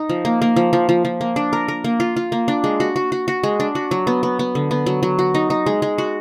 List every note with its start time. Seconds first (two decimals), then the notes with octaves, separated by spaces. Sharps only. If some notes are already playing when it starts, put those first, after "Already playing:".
Already playing: D#4
0.09 F3
0.25 A#3
0.42 A#3
0.56 F3
0.73 F3
0.89 F3
1.05 F3
1.21 A#3
1.36 D4
1.53 A#4
1.68 A#4
1.84 A#3
2.00 F4
2.16 F4
2.32 A#3
2.48 D4
2.64 G#3
2.80 F#4
2.96 F#4
3.12 F#4
3.28 F#4
3.43 G#3
3.60 D4
3.75 F#4
3.91 F#3
4.07 B3
4.23 B3
4.39 B3
4.55 D3
4.71 B3
4.86 F#3
5.03 F#3
5.19 F#4
5.34 D#4
5.50 D#4
5.66 G#3
5.82 G#3
5.98 F#4